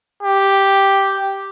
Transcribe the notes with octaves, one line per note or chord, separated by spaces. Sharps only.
G4